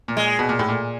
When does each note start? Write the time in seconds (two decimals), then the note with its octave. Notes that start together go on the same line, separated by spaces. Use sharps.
0.08 A#2
0.17 G#3
0.39 B2
0.49 A#2
0.59 A2
0.69 A#2